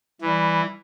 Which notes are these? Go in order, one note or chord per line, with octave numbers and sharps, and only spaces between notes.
E3 G3